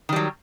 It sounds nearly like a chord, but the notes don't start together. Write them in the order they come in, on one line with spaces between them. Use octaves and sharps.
D#3 G3 F#3